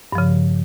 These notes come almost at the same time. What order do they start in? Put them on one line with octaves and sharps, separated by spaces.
G2 F3 C#3